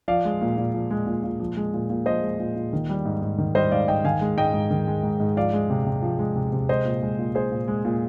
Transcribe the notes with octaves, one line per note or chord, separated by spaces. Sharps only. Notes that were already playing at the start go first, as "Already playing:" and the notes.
F3 D5 F5
G#3
A#2
A#2
F3
G#3
A#2
A#2
F3
G#3
A#2
A#2
F3 C5 D#5
G#3
A#2
A#2
D#3
G3
G#2
G#2
D#3
G3 C5 D#5
G#2 D5 F5
G#2 D#5 G5
D#3 F5 G#5
G#3
G#2 D#5 G5
G#2
D#3
G#3
G#2
G#2
F3 D5 F5
G#3
C3
C3
F3
G#3
C3
C3
G#3 C5 D#5
A#2
G#3
A#2
G#3 G#4 C5
A#2
G#3
A#2